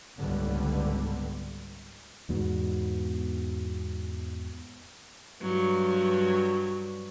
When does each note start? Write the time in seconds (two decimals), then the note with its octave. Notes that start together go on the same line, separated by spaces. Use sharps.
0.18 F#1 C#2 G#2 D3 G3 B3
2.29 E2 G#2 B2
5.42 G2 F#3